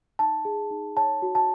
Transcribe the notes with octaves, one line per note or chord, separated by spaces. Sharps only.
D#4 A5
G#4
D#4
C#5 A5
F#4
A5